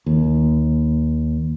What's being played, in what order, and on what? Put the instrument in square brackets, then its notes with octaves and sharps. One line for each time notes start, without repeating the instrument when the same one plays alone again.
[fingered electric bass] D#2